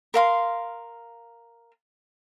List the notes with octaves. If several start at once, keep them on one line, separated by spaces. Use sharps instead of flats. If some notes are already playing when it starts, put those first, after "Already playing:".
A#4 F5 C6